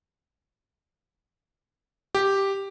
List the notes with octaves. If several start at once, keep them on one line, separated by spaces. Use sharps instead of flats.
G4